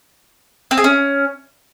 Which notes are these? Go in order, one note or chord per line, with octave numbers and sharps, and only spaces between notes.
C4
G#4
C#4